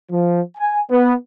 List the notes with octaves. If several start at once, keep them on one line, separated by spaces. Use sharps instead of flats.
F3
G#5
B3